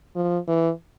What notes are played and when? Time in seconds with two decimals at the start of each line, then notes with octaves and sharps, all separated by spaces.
0.16 F3
0.48 E3